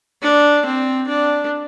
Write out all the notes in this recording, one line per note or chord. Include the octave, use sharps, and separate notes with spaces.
D4
C4
D4